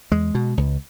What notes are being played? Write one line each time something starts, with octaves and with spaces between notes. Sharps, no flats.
E2 G#3
B2
C#2